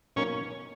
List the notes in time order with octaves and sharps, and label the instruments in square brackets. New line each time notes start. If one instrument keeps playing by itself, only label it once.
[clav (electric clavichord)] B2 F#3 A#3 D#4 A#4 [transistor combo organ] C#4